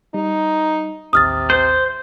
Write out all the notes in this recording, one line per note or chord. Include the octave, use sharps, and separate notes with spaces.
G3 D#4
A1 D#2 C3 D#6 F6 A6
C5